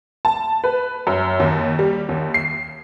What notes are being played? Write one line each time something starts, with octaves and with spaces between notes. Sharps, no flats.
A5
B4
F#2
D#2
G3
D#2
C7